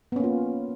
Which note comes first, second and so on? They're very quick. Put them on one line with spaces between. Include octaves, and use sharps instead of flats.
B3 C#4 A#3 F4